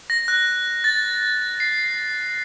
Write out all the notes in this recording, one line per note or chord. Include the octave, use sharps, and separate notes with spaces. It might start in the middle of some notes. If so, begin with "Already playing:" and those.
A#6
F#6
A6
C7